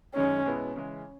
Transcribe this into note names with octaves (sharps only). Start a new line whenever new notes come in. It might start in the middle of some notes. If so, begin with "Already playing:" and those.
F#2 D#3 G#3 C#4 D#4
B2 G#3 B3 E4
C#3 E3 G#3